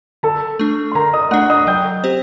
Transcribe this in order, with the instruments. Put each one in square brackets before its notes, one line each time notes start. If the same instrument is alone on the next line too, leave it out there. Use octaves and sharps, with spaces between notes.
[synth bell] D3 [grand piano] A4 A5
[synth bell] A3 D4
[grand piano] C6
[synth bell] D3 [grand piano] A#4 A#5
[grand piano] D#5 D#6
[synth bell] A3 D4 [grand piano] F#5 F#6
[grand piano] D#5 D#6
[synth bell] F#3 [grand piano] G5 G6
[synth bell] C4 G4 C5